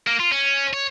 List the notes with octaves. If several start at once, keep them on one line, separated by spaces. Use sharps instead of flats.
A#3
F4
C#4
C#5